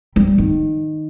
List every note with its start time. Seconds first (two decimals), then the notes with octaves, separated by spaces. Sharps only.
0.16 G3
0.38 D#3